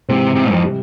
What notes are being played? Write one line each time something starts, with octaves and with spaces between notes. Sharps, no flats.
G#2 C3 E3 G#3 C4
C3
F2
C3 G3